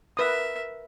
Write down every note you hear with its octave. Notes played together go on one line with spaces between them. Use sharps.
A#4 B4 E5 D#6